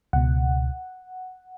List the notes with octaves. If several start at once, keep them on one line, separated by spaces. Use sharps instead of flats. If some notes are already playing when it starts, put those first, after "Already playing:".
C#2 B2 F#5